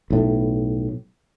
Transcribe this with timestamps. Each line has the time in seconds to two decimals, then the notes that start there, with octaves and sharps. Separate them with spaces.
0.10 B1 A2